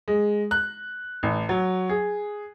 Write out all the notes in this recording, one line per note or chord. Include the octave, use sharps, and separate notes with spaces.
G#3
F#6
A1
F#3
G#4